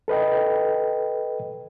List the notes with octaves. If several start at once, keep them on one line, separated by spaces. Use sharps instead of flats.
A4 B4 D#5 G5